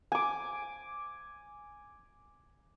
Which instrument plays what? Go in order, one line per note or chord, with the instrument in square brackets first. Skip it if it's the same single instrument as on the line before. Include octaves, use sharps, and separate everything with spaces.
[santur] G#5 D6